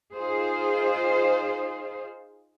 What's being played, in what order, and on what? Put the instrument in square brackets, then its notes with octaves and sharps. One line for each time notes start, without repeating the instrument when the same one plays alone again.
[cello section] D#4 F4 G#4 C5